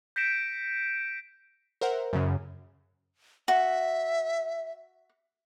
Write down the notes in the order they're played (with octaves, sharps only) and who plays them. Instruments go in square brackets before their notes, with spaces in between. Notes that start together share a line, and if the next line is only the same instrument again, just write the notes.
[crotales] G6 A#6 B6 C#7 D7 E7
[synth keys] A#4 C5 E5 F#5
F#2 C#3
[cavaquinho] F#4 [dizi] E5